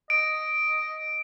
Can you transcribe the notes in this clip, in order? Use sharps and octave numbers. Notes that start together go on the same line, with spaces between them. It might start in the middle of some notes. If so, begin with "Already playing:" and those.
D#5 D7